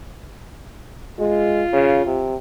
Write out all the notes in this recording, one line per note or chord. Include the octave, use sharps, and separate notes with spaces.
G#3 F4
C#3
C3